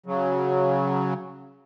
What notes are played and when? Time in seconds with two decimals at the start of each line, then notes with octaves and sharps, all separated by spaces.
0.06 C#3 F#3